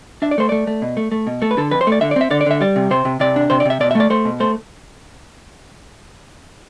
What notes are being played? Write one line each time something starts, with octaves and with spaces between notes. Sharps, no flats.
D4 E5
D5
A3 C5
A3 D5
A3
B2
A3
A3
B2
A3 A4
B4
D3 A4
F2 B4
C5
A3 D5
D3 E5
D5
C4 E5
D3 D5
D5
D3 E5
G3 D5
C3
C3 C5
C3
C3 D5
D4
C3 C5
D5
C3 E5
B2 D5
E5
A3
D5
A3 C5
B2
A3 C5